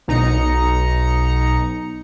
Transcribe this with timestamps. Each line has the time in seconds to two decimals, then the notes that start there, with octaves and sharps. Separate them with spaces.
0.08 B1 D#4 A#5 C#7